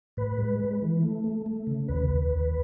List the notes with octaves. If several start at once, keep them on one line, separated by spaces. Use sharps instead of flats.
A2 B4
G#3
G#3
E3
A3
A3
A3
C#3
D#2 B4
D#2
D#2